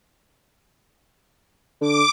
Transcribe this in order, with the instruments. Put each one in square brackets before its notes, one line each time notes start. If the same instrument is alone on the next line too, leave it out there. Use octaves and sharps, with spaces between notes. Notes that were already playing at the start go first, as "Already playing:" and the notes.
[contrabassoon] D3 [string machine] D6